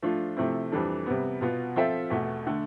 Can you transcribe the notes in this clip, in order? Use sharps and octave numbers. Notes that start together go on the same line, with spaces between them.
F3 A3 D4 F4
C3 F3 A3 C4 E4
F2 E3 G3 D4 A4
C3 G3 B3
B2 B3 F4
F3 C4 F4 A4 E5
E2 B2 A3
D3 A3